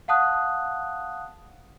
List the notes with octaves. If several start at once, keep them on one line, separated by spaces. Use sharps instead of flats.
F5 F#5 A5 D#6 F#6